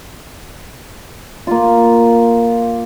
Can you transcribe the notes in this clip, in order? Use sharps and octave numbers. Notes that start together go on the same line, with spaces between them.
A#3 F4